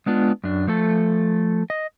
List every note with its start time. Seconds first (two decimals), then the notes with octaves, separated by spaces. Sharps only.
0.06 G#3 B3 D4 F4
0.44 F#2 D4
0.67 F3 A3 A4
1.70 D#5